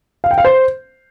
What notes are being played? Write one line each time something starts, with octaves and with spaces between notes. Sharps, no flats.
F5
G5
F5
C5